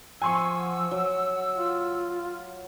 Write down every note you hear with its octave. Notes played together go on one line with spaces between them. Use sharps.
F3 F#5 G#5 C6 C#6 E6
F#3
F4